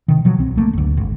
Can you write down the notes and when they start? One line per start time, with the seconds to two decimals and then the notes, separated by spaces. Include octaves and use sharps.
0.08 C3 D#3
0.25 B2 F3 F#3
0.38 C2 C4
0.56 A#1 A3 A#3
0.73 F#1 D2
0.97 G#1